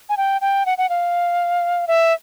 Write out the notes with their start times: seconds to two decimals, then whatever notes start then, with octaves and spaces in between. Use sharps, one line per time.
0.09 G#5
0.17 G5
0.41 G5
0.66 F#5
0.78 F#5
0.89 F5
1.88 E5